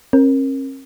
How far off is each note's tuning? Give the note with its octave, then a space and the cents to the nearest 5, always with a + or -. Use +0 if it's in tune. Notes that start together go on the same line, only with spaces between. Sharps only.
C#4 -45 A#4 +10